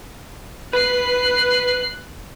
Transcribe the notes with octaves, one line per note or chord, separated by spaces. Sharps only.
B4 F#6 C7